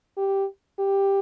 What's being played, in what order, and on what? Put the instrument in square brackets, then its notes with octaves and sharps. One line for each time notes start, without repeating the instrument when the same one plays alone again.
[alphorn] G4
G4